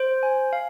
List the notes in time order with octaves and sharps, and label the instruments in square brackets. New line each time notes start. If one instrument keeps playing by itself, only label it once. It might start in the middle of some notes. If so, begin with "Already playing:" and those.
Already playing: [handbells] C5
G#5
F5